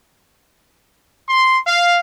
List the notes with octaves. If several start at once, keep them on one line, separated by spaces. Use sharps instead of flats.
C6
F5